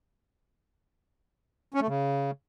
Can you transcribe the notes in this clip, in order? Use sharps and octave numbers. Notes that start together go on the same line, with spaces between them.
C#4
A3
C#3